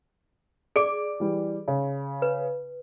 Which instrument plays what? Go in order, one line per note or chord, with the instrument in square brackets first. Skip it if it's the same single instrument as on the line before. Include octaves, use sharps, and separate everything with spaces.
[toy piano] G#4 D5 D6 [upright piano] D7
[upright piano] E3 G3
C#3
[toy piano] B4